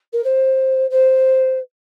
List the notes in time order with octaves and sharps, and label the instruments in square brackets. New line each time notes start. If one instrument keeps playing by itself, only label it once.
[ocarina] A#4
C5
C5